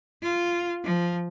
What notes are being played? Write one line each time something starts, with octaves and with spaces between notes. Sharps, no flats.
F4
F3